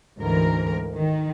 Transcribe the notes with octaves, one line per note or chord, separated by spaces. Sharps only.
D2 G#2 E3 A#4
D#3